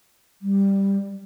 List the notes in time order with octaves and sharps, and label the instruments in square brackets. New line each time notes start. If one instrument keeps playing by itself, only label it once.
[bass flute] G3